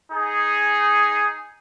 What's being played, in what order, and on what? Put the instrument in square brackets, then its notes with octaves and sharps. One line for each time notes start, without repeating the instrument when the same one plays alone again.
[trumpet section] D#4 G#4